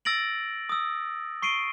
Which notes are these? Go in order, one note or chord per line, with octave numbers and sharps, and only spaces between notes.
E6 A6 A#6 D7 F#7
D#6 E6
C#6 C7 D7 D#7 G7